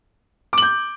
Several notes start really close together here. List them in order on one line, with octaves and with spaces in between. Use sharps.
D6 F#7 G6